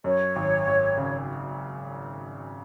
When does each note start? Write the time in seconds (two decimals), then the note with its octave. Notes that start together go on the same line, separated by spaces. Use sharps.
0.04 F#2 C#5
0.36 G#1
0.67 G#1
0.97 C#3